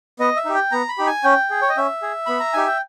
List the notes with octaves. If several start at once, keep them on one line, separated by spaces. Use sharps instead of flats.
B3 D#5
E5
D#4 G4
G5
B3 A#5
B5
D#4 G4
G#5
C#4 G5
G#4
C#5
D#5
C#4 E5
G#4
B3 B5
A#5
D#4 G4 G#5
G5